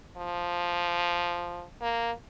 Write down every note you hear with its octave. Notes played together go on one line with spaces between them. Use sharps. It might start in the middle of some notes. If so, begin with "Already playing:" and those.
F3
A#3